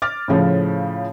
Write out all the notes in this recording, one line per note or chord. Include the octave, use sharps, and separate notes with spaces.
D6 F6 A6
A2 C#3 F3